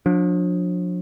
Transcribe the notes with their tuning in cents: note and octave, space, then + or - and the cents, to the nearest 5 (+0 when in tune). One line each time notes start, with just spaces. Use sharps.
F3 +45 D4 +0